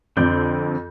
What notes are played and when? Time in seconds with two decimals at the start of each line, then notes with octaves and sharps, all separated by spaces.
0.17 F2 D3 C4 D5 G6